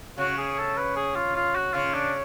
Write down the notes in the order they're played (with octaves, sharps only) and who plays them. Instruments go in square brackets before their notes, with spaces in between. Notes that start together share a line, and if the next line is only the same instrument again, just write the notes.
[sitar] C#3 [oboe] F#4
[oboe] G#4
A4
B4
G#4
F4
F4
F#4
[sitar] C#3 [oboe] F4
[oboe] D4